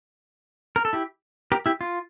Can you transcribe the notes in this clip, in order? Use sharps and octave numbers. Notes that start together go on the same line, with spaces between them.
A#4
A4
E4 G4
G4 A#4
E4 G4
F4